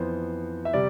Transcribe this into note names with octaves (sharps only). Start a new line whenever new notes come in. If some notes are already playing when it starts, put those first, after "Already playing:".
Already playing: F2 E3 B3 C5
E5
C3 G3 D5